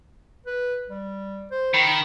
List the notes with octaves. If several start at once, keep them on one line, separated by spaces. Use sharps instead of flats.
B4
G3
C5
D#3 B5